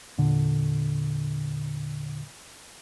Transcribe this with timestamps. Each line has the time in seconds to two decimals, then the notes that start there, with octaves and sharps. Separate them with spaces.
0.18 E2 A#2 D3